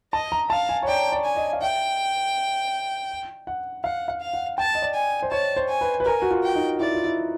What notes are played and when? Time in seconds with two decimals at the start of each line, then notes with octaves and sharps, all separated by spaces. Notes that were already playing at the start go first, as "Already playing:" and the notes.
0.13 D#5 A5
0.32 A#5
0.50 F5 A5
0.69 G#5
0.83 C#5
0.87 D5 G5
1.12 D5
1.24 G#5
1.36 D#5
1.53 F5
1.62 E5 G5
3.47 F#5
3.84 F5 F#5
4.08 F5
4.21 F5
4.33 F#5
4.58 G5 A5
4.75 D#5
4.82 D5
4.94 G#5
5.22 C5
5.32 C#5 A5
5.56 C5
5.68 G#5
5.81 B4
6.00 B4
6.05 A#4 G#5
6.22 F#4
6.31 F4
6.43 G5
6.55 D#4
6.80 E4 D5
6.95 F4
7.04 E4